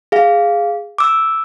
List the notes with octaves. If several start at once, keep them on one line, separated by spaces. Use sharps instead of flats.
G#4 F5
D6 E6